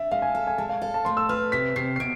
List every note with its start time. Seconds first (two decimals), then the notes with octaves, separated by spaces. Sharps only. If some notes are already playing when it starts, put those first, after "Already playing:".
Already playing: D4 E5
0.11 G#3 F5
0.22 G#5
0.34 A4 F5
0.47 G#5
0.58 G#3 A5
0.69 F5
0.82 A4 F5
0.94 A5
1.05 A3 C6
1.17 E6
1.29 B4 F6
1.52 C3 B6
1.76 C3 C7
1.96 C7
2.00 B2 D7